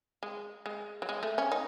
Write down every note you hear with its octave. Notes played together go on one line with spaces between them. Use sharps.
G#3
G#3
F#3
G#3
A3
C#4
D#4